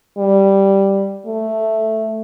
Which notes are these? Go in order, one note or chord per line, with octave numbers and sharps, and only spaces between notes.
G3
A3